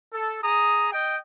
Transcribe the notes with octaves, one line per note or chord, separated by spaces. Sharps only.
A4
G#4 A#5 D#6
D#5 G5